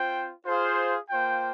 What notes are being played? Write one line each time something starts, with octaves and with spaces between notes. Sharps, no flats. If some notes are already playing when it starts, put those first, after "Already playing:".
Already playing: C4 F4 C5 G5
F4 G#4 C5 F5
A#3 F4 C5 G5